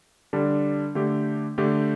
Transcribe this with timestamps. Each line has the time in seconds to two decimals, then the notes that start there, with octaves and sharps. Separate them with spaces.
0.33 D3 G3 D4 A4
0.95 D3 A3 G4
1.58 D3 A3 G4